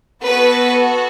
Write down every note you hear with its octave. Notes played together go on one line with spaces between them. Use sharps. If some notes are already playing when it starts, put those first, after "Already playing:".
B3 F#4 A4 B4